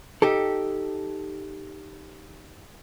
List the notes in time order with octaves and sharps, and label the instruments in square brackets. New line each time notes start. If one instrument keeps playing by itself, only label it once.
[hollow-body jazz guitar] D#4 G4 A4